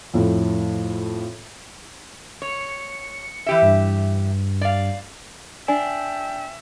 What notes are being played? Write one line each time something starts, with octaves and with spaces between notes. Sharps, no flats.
F2 A2
C#5 C#7
E3 G4 E5
G2
D5 F5
D4 E5 G5 G#5